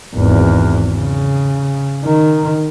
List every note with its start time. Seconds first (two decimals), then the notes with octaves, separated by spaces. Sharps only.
0.16 G#1 E2
0.95 C#3
2.04 D#3